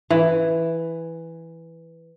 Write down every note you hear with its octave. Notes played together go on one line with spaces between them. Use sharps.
E3